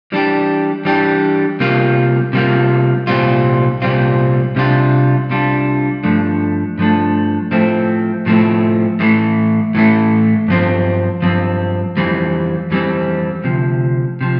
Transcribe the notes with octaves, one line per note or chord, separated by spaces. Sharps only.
E3 G3 D4 G4
E3 G3 D4 G4
C3 G3 A#3 F4
C3 G3 A#3 F4
C2 A#2 G3 C4 F4
C2 A#2 G3 C4 F4
C2 C3 G3 D4 F4
C2 C3 G3 D4 F4
G2 F3 A3 D4
G2 F3 A3 D4
A2 F3 A3 C4
A2 F3 A3 C4
A2 E3 A3
A2 E3 A3
G2 F3 C4
G2 F3 C4
F2 E3 G3 C4
F2 E3 G3 C4
D2 C3 F3
C3 F3